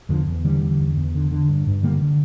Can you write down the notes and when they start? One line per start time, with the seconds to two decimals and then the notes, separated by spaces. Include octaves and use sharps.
0.09 E2 D3 F3
0.27 E2
0.44 D3 E3 G3
0.62 D3
0.79 E2
0.97 E2
1.15 D3
1.31 D3
1.49 G2
1.67 G2
1.83 D3 G3 A#3
2.02 D3